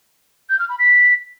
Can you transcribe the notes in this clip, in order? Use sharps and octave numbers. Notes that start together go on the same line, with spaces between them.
G6
F6
B5
B6